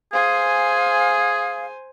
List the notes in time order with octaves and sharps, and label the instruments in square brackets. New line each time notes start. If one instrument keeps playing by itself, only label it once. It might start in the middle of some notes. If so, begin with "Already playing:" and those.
[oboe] G#4 [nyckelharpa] C5 G#5 [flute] F5